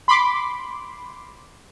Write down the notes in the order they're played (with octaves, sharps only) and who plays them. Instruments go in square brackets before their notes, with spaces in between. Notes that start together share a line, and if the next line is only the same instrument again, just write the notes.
[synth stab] B5 C6 D6